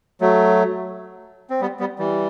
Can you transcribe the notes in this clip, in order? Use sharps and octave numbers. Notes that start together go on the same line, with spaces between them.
F#3 A3
C4
G3 B3
G3 B3
E3 G3